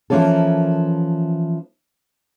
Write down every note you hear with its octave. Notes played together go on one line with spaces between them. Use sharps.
E3 F3 A#3 C#4 A4